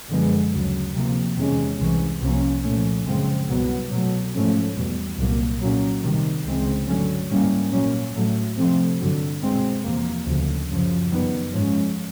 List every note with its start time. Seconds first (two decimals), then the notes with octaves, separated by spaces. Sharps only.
0.10 F#2 D3 F3 G#3 B3
0.52 D2 C#3 F#3
0.94 C3 F3 A#3
1.36 E2 C3 D#3 G#3 C#4
1.79 C2 C3 E3 G#3 C#4
2.22 C2 C3 F3 A#3 C#4
2.64 A#2 F3 A3 C#4
3.06 F#2 C#3 F3 G#3 C4
3.48 C2 B2 F#3 B3
3.91 B2 F#3 A3
4.34 G#2 F3 A3 C#4
4.76 E2 B2 G3
5.18 C2 A#2 F#3 A#3
5.61 A#2 F#3 A#3 C#4
6.02 C3 D#3 G3
6.45 C#2 C#3 E3 G#3 C4
6.87 G2 D3 F#3 A3 C#4
7.30 G#2 E3 G3 A#3 C#4
7.72 A#2 F#3 A#3 C#4
8.15 A2 F#3 A3
8.57 C3 F3 A3 C4
8.99 G2 D3 F#3
9.42 B2 G#3 C4
9.84 E2 C3 F3 A#3
10.26 D2 C#3 F3
10.69 F#2 C#3 F3
11.11 F#2 D#3 G3 B3
11.53 G#2 F3 G#3 C#4